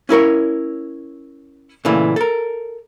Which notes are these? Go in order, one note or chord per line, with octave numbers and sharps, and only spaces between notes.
C#4 E4 A#4 C#5
A#2 C#3 E3 A3
A4 A#4